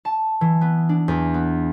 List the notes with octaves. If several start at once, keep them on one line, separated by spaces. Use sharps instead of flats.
A5
E3
B3
D4
E2
B3